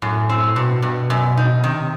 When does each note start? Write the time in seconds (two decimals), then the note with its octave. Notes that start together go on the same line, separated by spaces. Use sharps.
0.02 F#2 A2
0.29 C4
0.56 G2 B2
0.82 G2
1.10 F#2
1.37 D#4
1.54 B2
1.64 C3 D#3